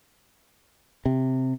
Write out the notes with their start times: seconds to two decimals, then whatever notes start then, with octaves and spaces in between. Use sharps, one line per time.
1.06 C3